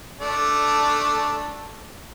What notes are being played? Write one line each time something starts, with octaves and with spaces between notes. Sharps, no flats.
A3 D4 D5